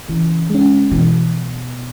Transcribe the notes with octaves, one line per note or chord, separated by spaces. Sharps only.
C#3 E3
G#3 C#4
B2 E3